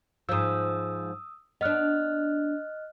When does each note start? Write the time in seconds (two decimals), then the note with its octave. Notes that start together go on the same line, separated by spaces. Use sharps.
0.29 G#2 F3 D#6 E6
1.61 B3 D4 D#5 F6 F#6